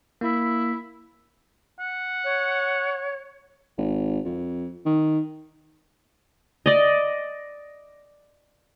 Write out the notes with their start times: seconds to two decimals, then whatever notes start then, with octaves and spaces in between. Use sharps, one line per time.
0.21 A#3 E4
1.79 F#5
2.24 C#5
3.78 G#1
4.25 F2
4.86 D#3
6.66 D5 D#5